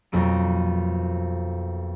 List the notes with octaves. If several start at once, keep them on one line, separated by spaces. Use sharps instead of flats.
B1 F2 A#3 D7